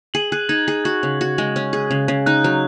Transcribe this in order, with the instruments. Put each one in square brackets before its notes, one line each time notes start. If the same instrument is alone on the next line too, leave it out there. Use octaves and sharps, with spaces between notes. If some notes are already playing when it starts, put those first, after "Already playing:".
[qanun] G#4 [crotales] F#7
[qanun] G#4 [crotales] F#6
[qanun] D#4 [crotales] G#6
[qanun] G#4
[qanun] F#4 [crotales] G#6
[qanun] C#3
F#4
G#3
C#4
G#4
C#3
C#3
[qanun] D#4 [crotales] F#6
[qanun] F#3